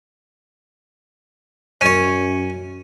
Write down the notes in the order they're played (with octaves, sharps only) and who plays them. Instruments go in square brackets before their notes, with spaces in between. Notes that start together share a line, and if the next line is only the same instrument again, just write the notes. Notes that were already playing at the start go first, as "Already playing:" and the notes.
[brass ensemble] F#2 [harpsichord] C#4 C#5